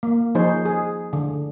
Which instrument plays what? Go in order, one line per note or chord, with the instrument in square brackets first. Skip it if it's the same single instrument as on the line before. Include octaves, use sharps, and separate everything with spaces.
[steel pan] A#3
F3 D#4 G#4 C5 C#5
G#4
D3